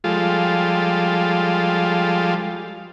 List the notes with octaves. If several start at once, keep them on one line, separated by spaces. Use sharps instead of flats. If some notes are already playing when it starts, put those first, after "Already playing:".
F3 G3 G#3 F4 A4